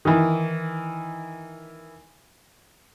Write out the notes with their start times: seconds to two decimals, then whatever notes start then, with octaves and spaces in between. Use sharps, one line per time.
0.05 D#3 E3